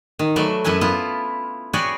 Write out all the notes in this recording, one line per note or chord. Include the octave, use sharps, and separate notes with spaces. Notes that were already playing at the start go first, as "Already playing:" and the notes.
D#3
F#3 A3 B4 D5 E5
F#2 E4 A4 B4 G#5
B3 E4 F4
F#4 G#4 B4 C#5 D5 G5